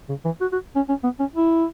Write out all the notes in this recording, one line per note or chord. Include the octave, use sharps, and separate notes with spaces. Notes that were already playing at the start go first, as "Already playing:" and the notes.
C#3
E3
F#4
F#4
C#4
C#4
B3
C#4
E4